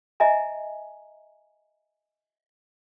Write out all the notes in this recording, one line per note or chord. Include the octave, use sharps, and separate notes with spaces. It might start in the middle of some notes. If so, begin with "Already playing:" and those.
D#5 E5 G#5 A#5